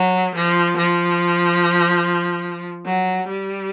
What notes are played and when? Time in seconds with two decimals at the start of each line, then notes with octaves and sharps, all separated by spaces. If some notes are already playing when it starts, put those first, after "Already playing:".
Already playing: F#3
0.35 F3
0.77 F3
2.86 F#3
3.28 G3